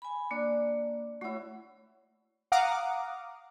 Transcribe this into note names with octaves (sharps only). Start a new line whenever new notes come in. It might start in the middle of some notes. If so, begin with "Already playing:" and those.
G#5 B5
A#3 D4
A3 E4 F#4 C#5
F5 F#5 A#5 D6 D#6